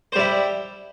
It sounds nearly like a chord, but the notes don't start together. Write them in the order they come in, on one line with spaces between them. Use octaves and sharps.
C5 G3 E4